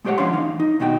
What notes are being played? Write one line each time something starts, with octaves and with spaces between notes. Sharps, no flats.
G#3 A3 G4 C5 C#5 F#5
G#2 F3 C#4 D4 F5 C6
E3 D#4 F5
D#4
D#2 B2 D#3 D#4 F#4 G5